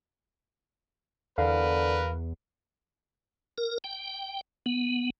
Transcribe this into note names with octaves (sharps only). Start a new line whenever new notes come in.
E2 D3 A#4 B4 F5
A#4
G5
B3